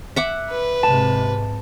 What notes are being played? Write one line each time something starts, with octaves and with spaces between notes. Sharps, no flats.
E5 F#5 D6
B4
G#2 C3 A5